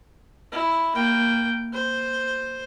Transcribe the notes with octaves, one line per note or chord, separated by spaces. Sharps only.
E4
A#3 G5
C5